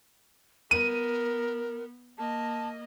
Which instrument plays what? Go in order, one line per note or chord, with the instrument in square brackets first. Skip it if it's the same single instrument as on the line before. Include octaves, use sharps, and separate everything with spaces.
[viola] B3 [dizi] A#4 [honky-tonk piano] D#7
[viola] A#3 D#5 [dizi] A5